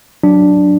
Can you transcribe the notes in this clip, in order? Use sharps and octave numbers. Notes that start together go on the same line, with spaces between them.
F#3 D4